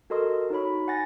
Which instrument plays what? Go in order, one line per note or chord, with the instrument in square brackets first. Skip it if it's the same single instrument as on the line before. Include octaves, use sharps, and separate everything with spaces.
[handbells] F#4 A4 A#4 D#5 C6 D#6
D#4 F#4 C#5 B5
F#5 G#5 A6 A#6